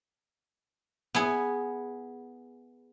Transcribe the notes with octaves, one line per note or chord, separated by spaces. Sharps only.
B3 E4 G#4